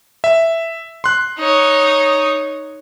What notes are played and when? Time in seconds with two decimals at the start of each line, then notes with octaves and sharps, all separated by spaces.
0.24 E5
1.04 C6 F#6
1.38 D#4 C#5